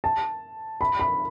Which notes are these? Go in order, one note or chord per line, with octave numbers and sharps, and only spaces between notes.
A5
B5
B5